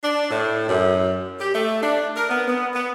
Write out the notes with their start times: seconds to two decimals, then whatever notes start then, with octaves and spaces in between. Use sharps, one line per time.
0.04 D4
0.31 A2
0.68 F#2
1.40 G4
1.54 A3
1.83 D4
2.16 A#4
2.29 B3
2.48 B3
2.75 B3